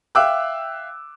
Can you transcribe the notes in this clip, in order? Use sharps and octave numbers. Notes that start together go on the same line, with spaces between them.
E5 F5 G5 D6 E6 F#6